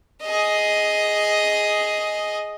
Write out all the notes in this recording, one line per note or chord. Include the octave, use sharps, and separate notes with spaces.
G#4 D#5